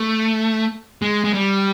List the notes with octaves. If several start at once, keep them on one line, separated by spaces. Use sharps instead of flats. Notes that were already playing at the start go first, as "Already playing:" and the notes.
Already playing: A3
G#3
G#3
G3